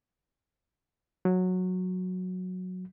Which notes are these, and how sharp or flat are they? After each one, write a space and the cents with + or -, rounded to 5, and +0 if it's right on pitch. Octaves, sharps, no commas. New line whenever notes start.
F#3 -10